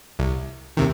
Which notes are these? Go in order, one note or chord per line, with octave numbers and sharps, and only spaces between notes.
C2
D#2 C3 D#3